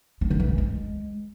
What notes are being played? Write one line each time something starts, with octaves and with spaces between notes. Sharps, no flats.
G#3
D3
E3
A#3
G#3